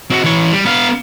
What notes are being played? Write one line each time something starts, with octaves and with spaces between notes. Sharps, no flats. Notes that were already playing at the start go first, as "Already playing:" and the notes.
C4 F#4
E3 C#5
G3
B3 F5